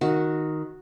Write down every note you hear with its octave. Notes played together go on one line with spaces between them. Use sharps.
D#3 F#4